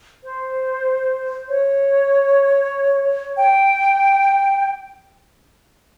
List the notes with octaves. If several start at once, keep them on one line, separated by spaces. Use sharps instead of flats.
C5
C#5
G5